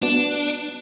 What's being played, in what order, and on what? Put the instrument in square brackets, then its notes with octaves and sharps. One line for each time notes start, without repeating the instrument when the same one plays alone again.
[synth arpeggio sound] B3 F#4 B4 D5 [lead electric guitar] D4